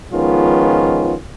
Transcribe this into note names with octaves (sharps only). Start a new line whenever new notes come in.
D#3 F3 G#3 B3 C#4 F4